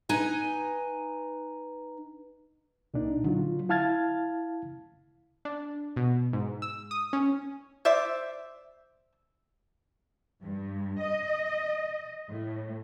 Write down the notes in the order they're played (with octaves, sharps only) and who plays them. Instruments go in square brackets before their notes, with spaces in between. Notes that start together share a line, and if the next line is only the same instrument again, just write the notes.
[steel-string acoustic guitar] D#4 B4 G#5
[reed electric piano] C2 A#2 D4 D#4
D3 F#3 F4
E4 F5 A5 F6 G#6 A6
[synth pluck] D4
B2
G#2
E6
D#6
C#4
[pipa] C5 D5 E5
[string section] G2
D#5
A2